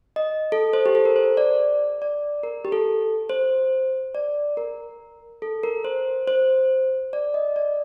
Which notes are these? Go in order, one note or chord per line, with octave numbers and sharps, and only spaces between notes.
D#5
A4
C5
G4
A4
A#4
C5
D5
D5
A#4
G4
A4
C5
D5
A#4
A4
A#4
C5
C5
D5
D#5
D5